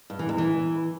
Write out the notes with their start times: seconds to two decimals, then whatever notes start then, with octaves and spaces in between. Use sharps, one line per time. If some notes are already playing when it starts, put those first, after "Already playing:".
0.10 G2
0.19 E3
0.29 E2
0.38 E3